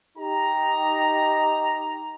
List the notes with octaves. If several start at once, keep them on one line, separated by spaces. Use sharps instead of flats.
D#4 G4 A#5